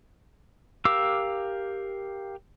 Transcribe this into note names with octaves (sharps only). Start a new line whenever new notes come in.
G4 A#4 F5 D6 E6